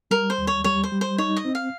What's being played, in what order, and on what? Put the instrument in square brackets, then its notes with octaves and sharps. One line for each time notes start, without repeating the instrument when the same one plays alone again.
[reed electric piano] G3 [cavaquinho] A#4
[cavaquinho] C5
[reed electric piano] D#2
[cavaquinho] C#5
[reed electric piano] G3 [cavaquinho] C#5
[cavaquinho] C5
[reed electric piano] G3
[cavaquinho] C5
[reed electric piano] D#4 [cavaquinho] C#5
[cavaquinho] D#5
[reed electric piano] C4
[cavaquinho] F5